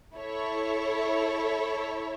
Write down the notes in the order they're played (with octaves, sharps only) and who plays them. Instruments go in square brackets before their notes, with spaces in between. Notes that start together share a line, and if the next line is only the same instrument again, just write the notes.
[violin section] E4 A4 C#5